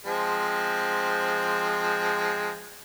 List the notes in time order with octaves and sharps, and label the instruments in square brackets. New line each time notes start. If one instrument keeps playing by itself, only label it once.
[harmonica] F3 G#3 C4